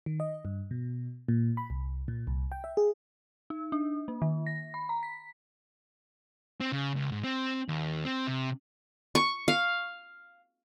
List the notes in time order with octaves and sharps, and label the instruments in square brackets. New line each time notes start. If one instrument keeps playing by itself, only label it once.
[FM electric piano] D#3
D#5
G2
B2
A#2
B5
C2
A#2
C2
G5
E5
G#4
[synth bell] D#4
D4
A#3
D#3
A#6
B5
A#5
B6
[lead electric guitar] C4
C#3
C#2
G#2
C4
D#2
C4
C3
[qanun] C#6
F5